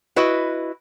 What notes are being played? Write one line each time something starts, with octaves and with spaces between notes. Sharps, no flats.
E4 F#4 B4 D#5